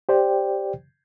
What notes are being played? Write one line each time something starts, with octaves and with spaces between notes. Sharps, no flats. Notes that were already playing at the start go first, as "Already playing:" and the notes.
G4 C5 D5 G5